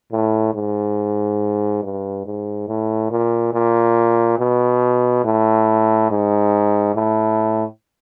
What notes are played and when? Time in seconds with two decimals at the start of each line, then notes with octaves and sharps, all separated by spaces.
0.13 A2
0.54 G#2
1.83 G2
2.26 G#2
2.68 A2
3.11 A#2
3.54 A#2
4.39 B2
5.25 A2
6.11 G#2
6.95 A2